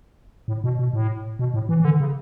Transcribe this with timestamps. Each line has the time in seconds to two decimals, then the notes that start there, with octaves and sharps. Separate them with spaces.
0.48 A2
0.64 B2
0.79 B2
0.93 A2
1.39 B2
1.54 A2
1.69 E3
1.80 E3
1.85 D3
2.00 C#3